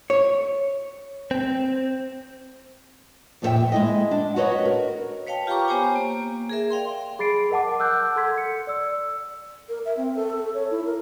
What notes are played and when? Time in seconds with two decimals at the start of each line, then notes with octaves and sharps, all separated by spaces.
0.10 C#5
1.31 C4
3.42 F2 A#2 D4 A4 E5 G5
3.72 G#3 E4 D#5
4.11 D4
4.36 F#4 A#4 B4 C#5 D#5
4.65 A#4
5.27 B4 C#5 F5 G5 A5
5.47 F4 G4 G5 A#5 C#6 D6
5.68 B3 G4 C5 C#5 G#5
5.95 A#3
6.50 G#4 A#4 E5
6.70 D5 F5 G5 C6
7.19 G#4 B5 A6 C7 D7
7.50 A#4 D#5 F#5 A5 D6
7.79 F#5 D6 E6 F#6 G6
8.16 A4 C6 G#6 B6
8.38 C#7
8.67 D5 E6
9.69 A#4
9.86 E5
9.97 C4
10.15 A4
10.37 A4
10.54 C#5
10.71 E4
10.86 A#4